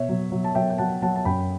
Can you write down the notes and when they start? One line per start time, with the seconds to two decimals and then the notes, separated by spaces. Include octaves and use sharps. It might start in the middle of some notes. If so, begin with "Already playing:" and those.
Already playing: B2 C#5 E5
0.09 F#3
0.32 F#3
0.44 A5
0.55 F#3 E5 G5
0.70 G5
0.78 F#3 F#5 A5
1.02 F#3 F#5 A5
1.16 A5
1.25 F#2 G5 B5